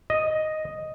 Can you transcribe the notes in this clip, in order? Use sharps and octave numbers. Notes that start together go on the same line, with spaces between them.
D#5